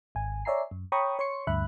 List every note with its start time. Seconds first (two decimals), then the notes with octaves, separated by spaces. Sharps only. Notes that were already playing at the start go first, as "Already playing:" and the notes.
0.15 G#1 G#5
0.45 C#5 D5 E5 G#5 A#5 C7
0.71 F#2
0.92 C#5 G5 A#5 B5 C#6 D#6
1.19 C#5 C6 C#6 C#7
1.47 D2 G2 E5 B5 F#6